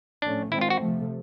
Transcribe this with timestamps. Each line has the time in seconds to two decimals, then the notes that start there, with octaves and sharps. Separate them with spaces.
0.22 A2 F3 A3 C#4 D4
0.51 D#3 G#3 C4 E4
0.61 F4
0.70 F#4
0.80 C3 F3 A3